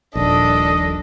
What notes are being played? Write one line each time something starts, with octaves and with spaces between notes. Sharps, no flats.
D#1 A#1 D4 A4 D#5